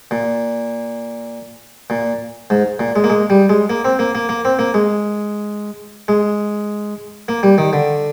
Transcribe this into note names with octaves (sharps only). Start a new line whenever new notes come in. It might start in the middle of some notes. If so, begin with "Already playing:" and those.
A#2
A#2
G#2
A#2
G#3
A#3
G#3
G3
G#3
A#3
C4
A#3
A#3
A#3
C4
A#3
G#3
G#3
A#3
G3
D#3
D3